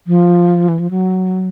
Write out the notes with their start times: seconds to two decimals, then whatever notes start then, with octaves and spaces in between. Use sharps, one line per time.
0.07 F3
0.68 E3
0.79 F3
0.91 F#3